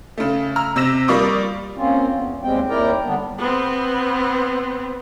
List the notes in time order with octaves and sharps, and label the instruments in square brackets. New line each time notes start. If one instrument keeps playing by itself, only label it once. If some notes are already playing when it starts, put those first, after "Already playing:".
[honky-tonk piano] C#3 A3
A#5 E6 F6
C3 E6 A#6 E7
G3 A#3 F4 D5 C#6 D#6
[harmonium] A#3 C4 C#4 F4
E2
D#2 G#2 G3 G#3 C4 G5
D#2 E4 A#4 D5 G5 A#5
D3 G3 B3 D4
[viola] B3 C4